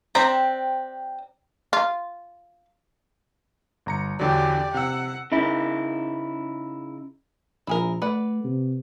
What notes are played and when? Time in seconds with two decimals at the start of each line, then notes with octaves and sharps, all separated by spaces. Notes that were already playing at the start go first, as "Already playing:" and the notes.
0.15 C4 D4 G4 A#5
1.73 F4
3.86 G1 A#5 C#7
4.19 E2 D3 F#3 G4 D5
4.74 C3 F#5 E6
5.32 C#3 D#4 E4
7.67 A#1 E4 G#4 A#4
8.02 A3 B4 D5 F#5
8.44 C3